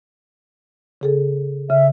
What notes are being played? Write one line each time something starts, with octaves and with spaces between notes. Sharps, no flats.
C#3 G#4 A4
C#3 E5